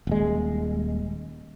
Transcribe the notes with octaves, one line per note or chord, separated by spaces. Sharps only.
D#1 G#3